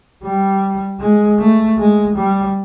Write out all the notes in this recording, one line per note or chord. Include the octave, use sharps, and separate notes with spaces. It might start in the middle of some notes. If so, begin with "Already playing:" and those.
G3
G#3
A3
G#3
G3